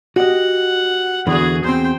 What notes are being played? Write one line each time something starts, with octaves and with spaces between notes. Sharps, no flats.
F#4 G4 D#5 F#5
E2 D3 E3 F#4 G#4
E2 C4 C5 G5